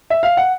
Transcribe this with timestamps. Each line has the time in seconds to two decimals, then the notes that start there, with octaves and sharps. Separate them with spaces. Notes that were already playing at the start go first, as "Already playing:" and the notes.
0.10 E5
0.23 F5
0.37 F#5